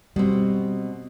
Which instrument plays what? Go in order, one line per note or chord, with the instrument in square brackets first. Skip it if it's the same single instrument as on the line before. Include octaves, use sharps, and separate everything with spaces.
[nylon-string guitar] B2 C4 [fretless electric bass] G3